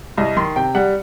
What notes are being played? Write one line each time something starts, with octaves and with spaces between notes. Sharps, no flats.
C2 D#5
D#3 C6
C3 G5
G3 F#5